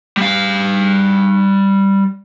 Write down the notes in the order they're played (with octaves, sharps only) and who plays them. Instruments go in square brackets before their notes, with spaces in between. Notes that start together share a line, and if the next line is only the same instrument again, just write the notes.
[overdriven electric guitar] G3 F5